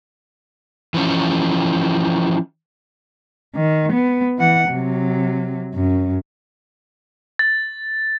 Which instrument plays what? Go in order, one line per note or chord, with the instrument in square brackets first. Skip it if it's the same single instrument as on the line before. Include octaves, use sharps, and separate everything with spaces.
[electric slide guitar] E3 F3 C#4
[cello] D#3
B3
E3 F#5
C3 F#3
F#2
[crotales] A6